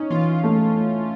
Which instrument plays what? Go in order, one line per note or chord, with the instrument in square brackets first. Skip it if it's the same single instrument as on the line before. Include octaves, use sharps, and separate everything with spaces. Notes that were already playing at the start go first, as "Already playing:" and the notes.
Already playing: [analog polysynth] C#4 [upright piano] D#4
[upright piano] E3 [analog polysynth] F4
[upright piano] A3